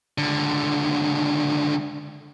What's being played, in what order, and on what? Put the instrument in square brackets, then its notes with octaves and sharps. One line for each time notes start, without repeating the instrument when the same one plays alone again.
[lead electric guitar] C#2 D3